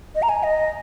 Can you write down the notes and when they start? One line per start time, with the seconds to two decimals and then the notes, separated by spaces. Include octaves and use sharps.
0.15 D#5
0.22 A#5
0.29 G#5
0.43 D#5